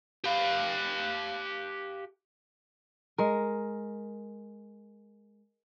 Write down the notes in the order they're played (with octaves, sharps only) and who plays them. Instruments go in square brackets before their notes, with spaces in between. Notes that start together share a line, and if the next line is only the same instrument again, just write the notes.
[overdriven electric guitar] G4 F5
[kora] G#3 A#4